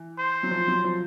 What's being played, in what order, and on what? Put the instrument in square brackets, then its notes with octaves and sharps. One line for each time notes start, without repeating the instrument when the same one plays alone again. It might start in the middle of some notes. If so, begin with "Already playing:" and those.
Already playing: [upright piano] E3
[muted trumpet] C5
[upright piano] F#3
F3
F#3
F3